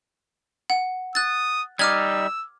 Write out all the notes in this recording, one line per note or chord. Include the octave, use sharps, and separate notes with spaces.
F#5
D#6 F#6 A6
G3 D#4 D6 E6 F6 G#6